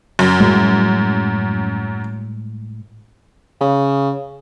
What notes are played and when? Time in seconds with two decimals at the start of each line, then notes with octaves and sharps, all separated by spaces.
0.19 F#2
0.40 A2 G3 G#3
3.61 C#3